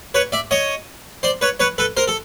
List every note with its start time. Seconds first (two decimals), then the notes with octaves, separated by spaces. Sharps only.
0.14 B4 C#5
0.32 D5 E5
0.51 C#5 D#5
1.23 C5 D5
1.41 B4 C#5
1.60 B4 C#5
1.78 A4 B4
1.97 A#4 C5
2.08 A4